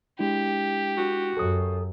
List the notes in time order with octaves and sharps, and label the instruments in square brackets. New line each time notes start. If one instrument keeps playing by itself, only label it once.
[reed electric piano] G#3 D4 E4 [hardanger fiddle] G4
[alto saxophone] F#4
[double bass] F#2 [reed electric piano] A4 D#6